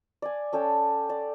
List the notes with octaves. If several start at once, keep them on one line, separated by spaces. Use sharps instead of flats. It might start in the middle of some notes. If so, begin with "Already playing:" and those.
D5 G#5
C#4 A4 D5 G5
D5